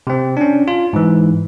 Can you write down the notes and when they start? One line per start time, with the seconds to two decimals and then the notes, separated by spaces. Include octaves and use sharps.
0.07 C3 C4
0.37 C#4 D4
0.68 F4
0.93 G#2 E3